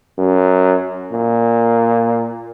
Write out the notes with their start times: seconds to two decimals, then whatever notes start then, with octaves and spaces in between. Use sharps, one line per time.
0.18 F#2
1.12 A#2